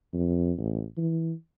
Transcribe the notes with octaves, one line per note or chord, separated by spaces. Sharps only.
F2
A1
E3